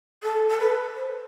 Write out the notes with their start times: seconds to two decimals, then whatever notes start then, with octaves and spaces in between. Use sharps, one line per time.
0.22 A4
0.50 A4
0.59 B4
0.96 C5